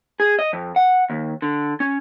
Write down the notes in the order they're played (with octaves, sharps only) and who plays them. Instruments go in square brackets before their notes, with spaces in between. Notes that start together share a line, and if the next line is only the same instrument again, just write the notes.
[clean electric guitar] G#4
D#5
F2
F#5
D#2
D3
C#4